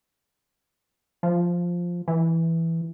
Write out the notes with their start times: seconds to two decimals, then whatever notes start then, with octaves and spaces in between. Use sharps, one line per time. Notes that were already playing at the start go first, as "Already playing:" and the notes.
1.23 F3
2.08 E3